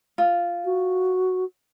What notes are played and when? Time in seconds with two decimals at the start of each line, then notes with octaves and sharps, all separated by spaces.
0.18 F4
0.64 F#4